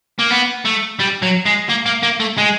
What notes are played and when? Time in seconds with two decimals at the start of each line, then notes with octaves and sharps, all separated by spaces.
0.19 A#3
0.31 B3
0.65 A3
0.99 G3
1.22 F#3
1.45 G#3
1.69 A#3
1.86 A#3
2.03 A#3
2.20 A3
2.38 G#3